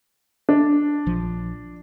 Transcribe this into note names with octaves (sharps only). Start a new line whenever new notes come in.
D4
A#1 F3